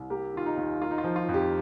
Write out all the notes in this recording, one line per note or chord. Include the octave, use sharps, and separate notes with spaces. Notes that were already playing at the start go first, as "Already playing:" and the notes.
Already playing: C2
A#3 G4
D#3 F4
D#4
D#2
A#3 F4
D#4
F4
F3
F4
F2
G4